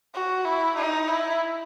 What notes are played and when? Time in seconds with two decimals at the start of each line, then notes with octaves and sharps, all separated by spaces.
0.14 F#4
0.45 E4
0.77 D#4
1.08 E4